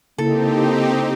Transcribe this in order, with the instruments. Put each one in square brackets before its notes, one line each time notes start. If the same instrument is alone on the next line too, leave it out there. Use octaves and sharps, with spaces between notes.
[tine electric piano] C#3 E4 [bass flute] A#3 [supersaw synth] C4 D#4 G4 [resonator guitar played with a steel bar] A4